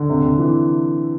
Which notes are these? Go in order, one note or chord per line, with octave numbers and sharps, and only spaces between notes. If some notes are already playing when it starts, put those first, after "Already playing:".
Already playing: D3
C3
C3
E3